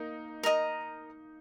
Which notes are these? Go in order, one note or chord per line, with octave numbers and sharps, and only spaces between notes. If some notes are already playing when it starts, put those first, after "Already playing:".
Already playing: A#3 D#4 A#4
A#4 D#5 A#5